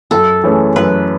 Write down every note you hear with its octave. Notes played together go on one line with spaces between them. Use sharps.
F#2 A4
E3 A3 C#4 G#4
F#2 B4